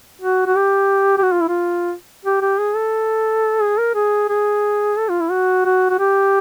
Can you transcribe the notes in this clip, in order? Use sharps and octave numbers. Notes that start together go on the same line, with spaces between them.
F#4
F#4
G4
G4
F#4
F4
E4
F4
G4
G4
G#4
A4
G#4
A#4
G#4
G#4
A4
F4
E4
F#4
F#4
F#4
G4